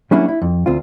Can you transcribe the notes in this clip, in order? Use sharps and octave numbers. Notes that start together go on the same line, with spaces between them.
F#3 G3 A#3 C#4 D4 E4
E4
F2
D2 C4 F4